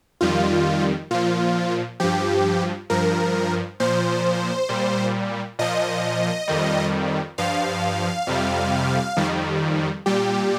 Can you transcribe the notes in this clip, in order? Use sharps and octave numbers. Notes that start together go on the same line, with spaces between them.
F2 D#3 G3 F4
A#2 F3 F4
G2 F3 G4
G2 F3 A#4
A#2 F3 C5
A#2 G3
A#2 F3 D#5
F2 D#3 G3
G2 F3 F5
F2 C3 G3
F2 D#3 G3
A#2 G3 G4